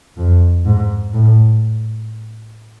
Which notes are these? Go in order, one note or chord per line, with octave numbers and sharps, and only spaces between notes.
F2
G#2
A2